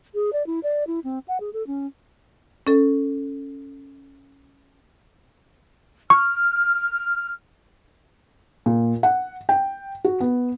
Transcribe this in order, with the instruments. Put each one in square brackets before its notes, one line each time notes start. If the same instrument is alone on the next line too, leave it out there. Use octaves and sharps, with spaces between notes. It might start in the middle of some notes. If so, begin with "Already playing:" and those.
[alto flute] G#4
D5
E4
D5
E4
C4
F#5
G#4
A4
C#4
[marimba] C#4 A4
[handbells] C#6 [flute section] F6
[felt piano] A#2
F#5
G5
F#4
B3